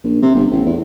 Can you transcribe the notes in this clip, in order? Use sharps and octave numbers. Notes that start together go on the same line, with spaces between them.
A#1
C3
G1
A1
E2